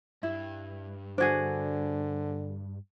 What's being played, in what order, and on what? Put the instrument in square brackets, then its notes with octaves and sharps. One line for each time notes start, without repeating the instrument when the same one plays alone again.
[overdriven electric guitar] G2 [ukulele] E4
[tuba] D3 [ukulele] D4 F#4 G#4 [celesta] C5 G#6